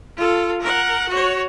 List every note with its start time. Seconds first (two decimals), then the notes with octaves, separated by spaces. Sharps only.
0.17 F4 A4
0.61 A#4 F#5
1.09 F#4 C#5